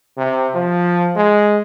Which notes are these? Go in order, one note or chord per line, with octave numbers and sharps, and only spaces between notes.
C3
F3
G#3